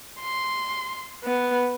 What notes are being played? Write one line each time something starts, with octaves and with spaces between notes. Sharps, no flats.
C6
B3